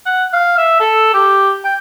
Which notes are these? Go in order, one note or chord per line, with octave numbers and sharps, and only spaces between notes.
F#5
F5
E5
A4
G4
G5